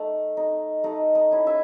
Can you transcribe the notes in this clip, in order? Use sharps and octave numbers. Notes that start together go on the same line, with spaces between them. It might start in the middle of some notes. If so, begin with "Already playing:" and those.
Already playing: A3 D#4
D#4
A3 D#4 D#5
D#4 D#5
C#4 E4
E4 E5